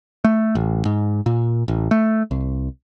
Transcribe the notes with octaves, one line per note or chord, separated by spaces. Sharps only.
A3
A1
G#2
A#2
A1
A3
C2